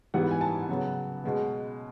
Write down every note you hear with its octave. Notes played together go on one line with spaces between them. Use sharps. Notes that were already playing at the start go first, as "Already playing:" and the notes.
G#2 E3 G3 B3 F#5
G#5
A5
C#3 F#3 B3
B2 G#3 B3